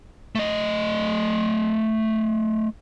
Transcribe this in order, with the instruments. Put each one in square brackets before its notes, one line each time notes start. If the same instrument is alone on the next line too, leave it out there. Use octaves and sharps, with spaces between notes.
[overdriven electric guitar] A3 D#5